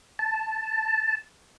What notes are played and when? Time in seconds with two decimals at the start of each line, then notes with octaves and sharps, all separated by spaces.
0.19 A5